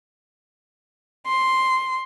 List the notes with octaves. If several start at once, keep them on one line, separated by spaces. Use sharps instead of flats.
C6